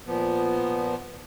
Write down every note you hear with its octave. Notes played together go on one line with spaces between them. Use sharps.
A#2 F3 B3